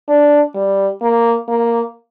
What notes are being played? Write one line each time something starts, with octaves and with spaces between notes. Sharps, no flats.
D4
G3
A#3
A#3